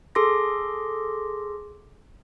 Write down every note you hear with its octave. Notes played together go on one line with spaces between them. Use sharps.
G#4 A4 C6 D6 A#6